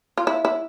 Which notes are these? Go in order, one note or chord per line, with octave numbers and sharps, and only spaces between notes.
F4
E4
E4